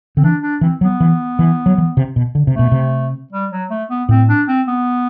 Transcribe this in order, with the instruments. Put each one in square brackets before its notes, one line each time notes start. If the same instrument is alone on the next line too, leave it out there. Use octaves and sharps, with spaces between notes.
[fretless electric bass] D3 [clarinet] C4
[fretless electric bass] E3 [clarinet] D4
[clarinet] D4
[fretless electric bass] E3 [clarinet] C4
[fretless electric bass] F#3 [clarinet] B3
[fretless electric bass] E3
E3
F#3
E3
C3
B2
D3
C3
[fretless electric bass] B2 [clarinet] A3
[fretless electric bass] C3
[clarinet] G3
F#3
A3
B3
[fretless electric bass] A2 [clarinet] C4
[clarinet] D4
C4
B3